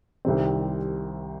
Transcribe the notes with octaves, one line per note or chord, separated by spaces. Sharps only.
C2 C3 D#3 G3 C4